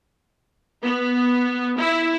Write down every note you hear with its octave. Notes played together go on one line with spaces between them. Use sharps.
B3
E4